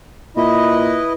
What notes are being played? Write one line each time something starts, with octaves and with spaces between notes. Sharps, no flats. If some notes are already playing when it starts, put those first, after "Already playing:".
A#2 E4 B4 D#5